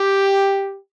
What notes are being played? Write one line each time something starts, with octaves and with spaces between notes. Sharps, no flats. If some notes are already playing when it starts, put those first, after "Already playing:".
Already playing: G4